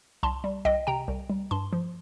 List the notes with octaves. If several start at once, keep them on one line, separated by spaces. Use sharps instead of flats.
C2 A5 C6
G3
C2 D#5 G5
C3 G5 A#5
C2
G3
G2 A5 C6
F3